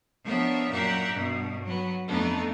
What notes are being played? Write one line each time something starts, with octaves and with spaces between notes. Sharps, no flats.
F3 B3 D4 A#4 C#5 E5
F#2 A#2 G4 E5 F#5 A#5
G2 B2
F#3 B3
F2 A3 B3 D4 D#4